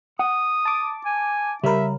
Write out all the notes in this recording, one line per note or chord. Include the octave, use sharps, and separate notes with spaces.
F#5 D#6
A5 D6
G#5
C#3 G3 A#4 E5 B5